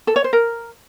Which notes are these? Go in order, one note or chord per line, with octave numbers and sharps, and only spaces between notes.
A4
C#5
C5
A#4